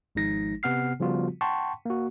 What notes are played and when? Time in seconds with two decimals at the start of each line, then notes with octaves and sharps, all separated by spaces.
0.15 G#1 F3 G#3 D#4 A#6
0.63 C3 B3 F#5 F6 C7
1.00 C#3 F3 G3 B3 F4 F#4
1.41 F#5 G5 A5 C6 C#6
1.86 A#3 F#4